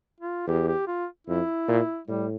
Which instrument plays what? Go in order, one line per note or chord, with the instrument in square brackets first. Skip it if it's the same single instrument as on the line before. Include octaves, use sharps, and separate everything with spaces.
[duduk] F4
[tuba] E2 [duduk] G4
[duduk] G4
F4
[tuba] F2 [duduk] E4
[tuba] A#2
[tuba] A2 [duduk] G3